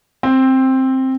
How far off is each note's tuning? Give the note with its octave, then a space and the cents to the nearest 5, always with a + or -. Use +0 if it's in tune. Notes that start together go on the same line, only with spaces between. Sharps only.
C4 +10